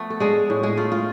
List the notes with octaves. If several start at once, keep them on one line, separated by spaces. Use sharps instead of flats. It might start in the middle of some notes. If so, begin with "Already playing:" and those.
Already playing: F3 A3 B3
A4
G#3 D4 G#4
A2
G#3 G#4
A3 F4
F4